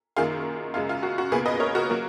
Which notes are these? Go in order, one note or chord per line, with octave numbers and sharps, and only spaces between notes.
F#2 D#3 A#3 F4 G#4
F#2 C#3 G#3 F4
F4
F#4
F#4
C#2 B2 A#3 G#4 B4
B4 D#5
A#4 C#5
F#4 A#4
F#3 A#3